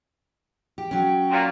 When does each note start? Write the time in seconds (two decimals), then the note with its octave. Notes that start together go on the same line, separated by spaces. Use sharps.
0.78 G4
0.91 F#3 C#4 G5
1.31 A#2